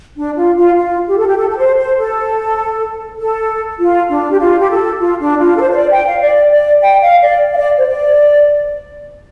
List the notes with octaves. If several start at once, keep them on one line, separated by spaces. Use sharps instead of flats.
D4
F4
F4
F4
G4
A4
G4
A4
A4
C5
C5
A4
A4
F4
D4
G4
F4
G4
A4
F4
D4
F4
A4
C5
C5
D5
G5
F5
D5
D5
G5
F5
D5
F5
D5
C5
D5